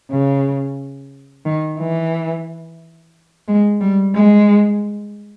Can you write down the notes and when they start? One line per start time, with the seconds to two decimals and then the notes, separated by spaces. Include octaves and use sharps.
0.11 C#3
1.46 D#3
1.79 E3
3.48 G#3
3.81 G3
4.15 G#3